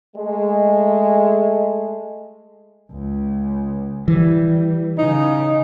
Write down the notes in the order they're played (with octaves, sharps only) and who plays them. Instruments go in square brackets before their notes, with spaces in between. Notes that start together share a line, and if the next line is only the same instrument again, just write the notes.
[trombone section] G#3 A3
[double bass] C#2
[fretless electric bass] E3 [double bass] G3
[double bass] C#3 [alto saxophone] D#4